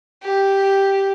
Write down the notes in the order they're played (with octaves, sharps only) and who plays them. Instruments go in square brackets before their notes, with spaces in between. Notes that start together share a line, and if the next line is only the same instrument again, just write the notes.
[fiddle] G4